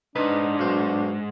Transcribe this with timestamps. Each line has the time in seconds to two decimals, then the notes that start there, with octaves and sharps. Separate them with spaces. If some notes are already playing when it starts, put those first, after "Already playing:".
0.16 C#2 G#2 D4 D#4 B4
0.59 B1 F#4 C5